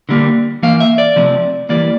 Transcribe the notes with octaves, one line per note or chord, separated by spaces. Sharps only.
D3 G3 A#3
E3 A#3 F5
E5
D5
C3 F3 A3 C4
E3 G3 A#3 D5